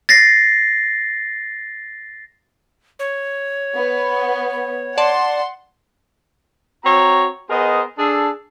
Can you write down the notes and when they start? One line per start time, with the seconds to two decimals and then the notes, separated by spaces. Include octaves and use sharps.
0.09 A6 A#6 C7
2.99 C#5
3.75 B3
4.97 D5 F#5 A5 C6
6.85 C4 F#4 C#5 A#5
7.50 B3 G#4 A#4 C5 D#5
7.98 D4 G#4 A4